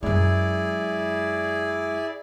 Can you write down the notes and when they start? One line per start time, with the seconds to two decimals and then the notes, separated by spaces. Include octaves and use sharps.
0.03 F#2 G#3 E4 G#4 D5